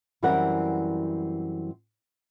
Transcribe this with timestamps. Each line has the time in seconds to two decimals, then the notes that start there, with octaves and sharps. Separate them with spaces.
0.23 F#2 E3 G3 C4 A#4 F#5